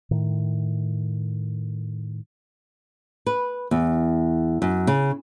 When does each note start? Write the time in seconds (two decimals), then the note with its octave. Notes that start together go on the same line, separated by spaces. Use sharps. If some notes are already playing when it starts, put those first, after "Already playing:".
0.11 A2 D#3
3.27 B4
3.71 E2
4.62 F#2
4.87 C#3